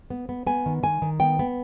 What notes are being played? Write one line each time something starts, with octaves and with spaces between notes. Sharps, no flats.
B3
B3
B3 G#5
D#3
D#3 G#5
D#3
B3 G5
B3